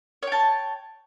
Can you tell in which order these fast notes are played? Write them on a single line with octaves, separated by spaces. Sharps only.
C#5 G5 A5